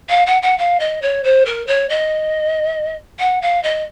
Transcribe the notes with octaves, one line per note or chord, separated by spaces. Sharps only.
F5
F#5
F#5
F5
D#5
C#5
C5
A#4
C#5
D#5
F#5
F5
D#5